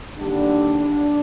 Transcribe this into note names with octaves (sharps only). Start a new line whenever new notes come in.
D#2 D3 G3 D4